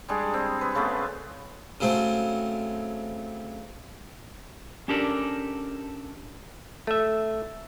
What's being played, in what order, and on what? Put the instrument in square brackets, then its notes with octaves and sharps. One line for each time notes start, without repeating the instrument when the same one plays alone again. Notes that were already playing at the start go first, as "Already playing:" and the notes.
[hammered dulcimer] G3 G#3 D4 G#4
C4
B4
C#3 G#3 A3 B3
[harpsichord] C#3 F#3 A3 C4
[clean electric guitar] C#4 D4 G4 A4 A#4 D5
[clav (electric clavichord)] A3 E5